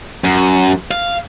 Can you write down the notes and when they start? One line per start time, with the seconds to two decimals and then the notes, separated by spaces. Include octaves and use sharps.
0.24 F#2
0.91 F5